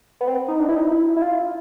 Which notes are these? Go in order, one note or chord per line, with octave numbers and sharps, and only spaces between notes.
B3
C4
D#4
D4
E4
D#4
E4
E4
F4